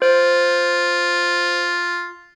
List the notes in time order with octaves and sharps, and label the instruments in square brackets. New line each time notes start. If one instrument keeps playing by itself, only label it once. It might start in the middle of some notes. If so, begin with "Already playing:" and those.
[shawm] F4 [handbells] C5